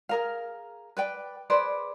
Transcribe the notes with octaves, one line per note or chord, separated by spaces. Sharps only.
G#4 A#4 F5
B4 D5 G5
G#4 B4 C5 D5